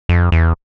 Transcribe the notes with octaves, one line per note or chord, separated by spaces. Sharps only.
F2
E2